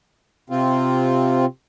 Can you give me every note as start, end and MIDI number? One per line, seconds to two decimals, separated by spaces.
0.50 1.45 48
0.50 1.45 60
0.50 1.45 65